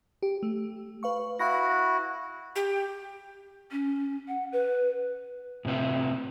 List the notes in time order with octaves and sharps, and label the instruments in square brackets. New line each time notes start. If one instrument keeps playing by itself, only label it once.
[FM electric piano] G4
A3
B4 F5 C#6
[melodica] E4 F#4 [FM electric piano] F5 B5 A#6
[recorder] G4
[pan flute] C#4
F#5
B4
[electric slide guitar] A2 C3 C4 B4 E5